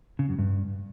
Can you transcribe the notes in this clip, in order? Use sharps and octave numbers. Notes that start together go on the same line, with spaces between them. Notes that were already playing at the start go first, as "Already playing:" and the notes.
C#3
F#2
G2